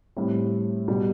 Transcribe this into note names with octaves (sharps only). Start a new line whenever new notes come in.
A2 G3 C4 E4
B2 G3